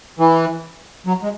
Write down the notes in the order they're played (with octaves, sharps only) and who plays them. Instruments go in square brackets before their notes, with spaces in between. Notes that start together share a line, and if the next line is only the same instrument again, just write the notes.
[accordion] E3
F#3
G#3